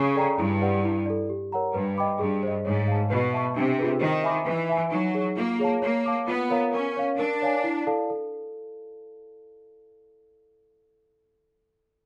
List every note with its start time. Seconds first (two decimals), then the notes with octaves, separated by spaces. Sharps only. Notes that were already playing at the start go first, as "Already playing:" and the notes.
Already playing: C#3
0.15 A4 D5 G5 A#5
0.39 G2 E4
0.61 G4 B4 D5 F#5
0.84 E4
1.06 A4 D5
1.30 G4
1.52 A#4 C#5 F#5 A#5
1.74 G2 B4
1.98 D#5 G5 B5 D6
2.19 G2 G#4
2.43 C5 D#5
2.65 G#2 C#5
2.88 F5 A5
3.10 B2 B4
3.33 E5 A5 C#6
3.56 C3 D4
3.79 F4 G#4 B4
4.01 D#3 C5
4.24 E5 G#5 B5 D6
4.46 E3 B4
4.69 E5 G#5
4.92 F#3 D#4
5.15 G#4 C#5
5.37 A#3 F4
5.59 G#4 C#5 F5 A5
5.82 A#3 C#5
6.06 F5 A5 D6
6.28 B3 F4
6.50 A#4 C#5 F5 A#5
6.73 C#4 A#4
6.97 C#5 F5
7.18 D4 A#4
7.42 C#5 F5 G#5
7.64 E4
7.87 A4 D5 F5 A5
8.10 A4